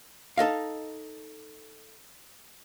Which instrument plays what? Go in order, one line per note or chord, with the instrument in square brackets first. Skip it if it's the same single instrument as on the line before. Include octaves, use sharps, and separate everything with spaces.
[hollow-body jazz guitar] D#4 A4 D#5 F5